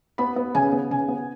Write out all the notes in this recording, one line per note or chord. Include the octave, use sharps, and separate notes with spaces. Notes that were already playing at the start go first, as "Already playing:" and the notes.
B3 B5
B3
C#3 G#5
B3
C#3 G#5
B3